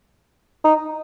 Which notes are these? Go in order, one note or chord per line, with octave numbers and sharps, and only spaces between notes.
D#4